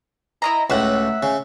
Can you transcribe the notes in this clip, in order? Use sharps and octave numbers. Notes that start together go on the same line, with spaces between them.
E4 D#5 A#5
C#2 A2 E5 F#5
C#3